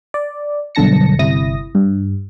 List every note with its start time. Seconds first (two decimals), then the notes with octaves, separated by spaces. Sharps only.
0.14 D5
0.75 B1 G2 D3 A5 A#6 C#7
1.19 G1 C3 E4 D#6 A#6
1.75 G2